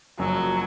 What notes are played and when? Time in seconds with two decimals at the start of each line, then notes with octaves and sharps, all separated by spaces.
0.19 F#1 F#2 F3 F#3